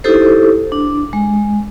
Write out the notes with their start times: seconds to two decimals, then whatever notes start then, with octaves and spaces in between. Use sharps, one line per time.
0.04 D#4 E4 G4 A4 C5
0.72 D4
1.13 G#3